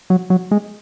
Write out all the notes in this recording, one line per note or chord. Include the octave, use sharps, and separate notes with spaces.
F#3
F#3
G#3